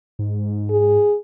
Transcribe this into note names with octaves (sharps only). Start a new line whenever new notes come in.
G#2
G#4